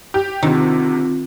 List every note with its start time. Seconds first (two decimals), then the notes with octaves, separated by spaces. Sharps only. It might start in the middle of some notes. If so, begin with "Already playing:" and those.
0.14 G4
0.43 D2 C3 D#3 C4 F4